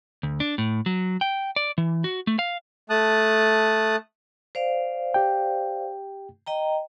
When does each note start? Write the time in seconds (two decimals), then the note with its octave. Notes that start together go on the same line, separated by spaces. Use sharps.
0.23 D2
0.40 D4
0.58 A2
0.86 F#3
1.21 G5
1.56 D5
1.78 E3
2.04 F#4
2.27 A3
2.39 F5
2.90 A3 A5 D#6 F#6
4.55 C5 D5 F5
5.14 G4 G5
6.46 D#5 G5 A#5